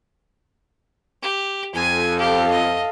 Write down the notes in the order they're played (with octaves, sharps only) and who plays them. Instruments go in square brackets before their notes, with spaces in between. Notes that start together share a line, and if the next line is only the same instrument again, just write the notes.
[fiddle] G4
[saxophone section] F2 [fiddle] G#5
[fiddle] G4 [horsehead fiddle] A4 F5
[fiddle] D#5